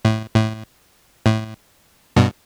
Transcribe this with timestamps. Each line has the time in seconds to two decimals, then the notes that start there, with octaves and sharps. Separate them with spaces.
0.05 A2
0.35 A2
1.26 A2
2.16 G2 B2